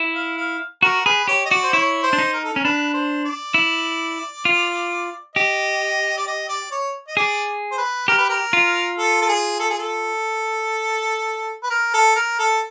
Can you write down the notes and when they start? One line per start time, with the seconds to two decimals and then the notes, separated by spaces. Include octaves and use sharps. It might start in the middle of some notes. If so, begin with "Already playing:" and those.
Already playing: E4
0.15 F5
0.38 F5
0.82 F#4 A#4
1.06 G#4 B4
1.28 G4 C#5
1.46 D#5
1.50 F#4 D5
1.63 C5
1.73 E4 C#5
2.03 C5
2.13 D4
2.19 D#4
2.33 A#4
2.44 A4
2.53 C#4 A#4
2.65 D4 B4
2.94 C5
3.25 D5
3.54 E4
4.45 F4
5.35 G4 D#5
6.18 D5
6.27 D#5
6.49 D5
6.71 C#5
7.08 D#5
7.17 G#4 D5
7.72 C5
7.78 B4
8.08 G4 A#4
8.18 B4
8.29 A#4
8.53 F4
8.98 A4
9.22 A4
9.29 G#4
9.59 A4
9.70 G#4
9.79 A4
11.63 B4
11.70 A#4
11.94 A4
12.16 A#4
12.39 A4